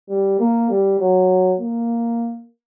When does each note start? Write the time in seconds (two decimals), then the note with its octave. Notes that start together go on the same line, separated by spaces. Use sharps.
0.09 G3
0.40 A#3
0.70 G3
1.00 F#3
1.59 A#3